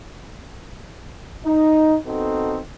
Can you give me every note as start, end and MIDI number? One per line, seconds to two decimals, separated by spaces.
1.45 1.96 63
2.06 2.59 59
2.06 2.59 60
2.06 2.59 63
2.06 2.59 66
2.06 2.59 69